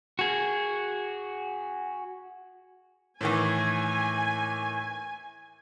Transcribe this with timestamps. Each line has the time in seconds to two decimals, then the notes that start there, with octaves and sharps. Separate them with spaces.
0.19 F#4 G#4
3.21 A2 D#3 E3 G#5